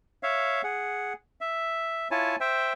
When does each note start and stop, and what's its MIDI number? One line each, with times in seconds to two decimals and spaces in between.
0.23 0.62 73
0.23 0.62 76
0.23 0.62 77
0.64 1.13 68
0.64 1.13 78
1.41 2.08 76
2.11 2.36 64
2.11 2.36 65
2.11 2.36 73
2.11 2.36 80
2.11 2.36 81
2.41 2.73 72
2.41 2.73 76
2.41 2.73 79